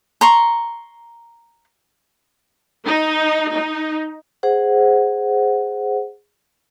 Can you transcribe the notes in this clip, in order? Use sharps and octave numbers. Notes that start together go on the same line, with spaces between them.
A#5 C6 C#6
D#4
D#4
G#4 C5 F#5